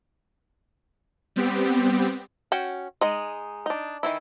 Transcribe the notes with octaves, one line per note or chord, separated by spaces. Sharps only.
G3 B3 C4 G4
C#4 F#4 G5
G#3 D#4
D4 D#4
D#3 E3 E4